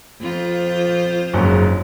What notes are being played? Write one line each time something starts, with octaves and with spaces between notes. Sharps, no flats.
F2 F4 C5
F#1 G#2 F#3